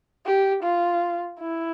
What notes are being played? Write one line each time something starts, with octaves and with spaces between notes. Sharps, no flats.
G4
F4
E4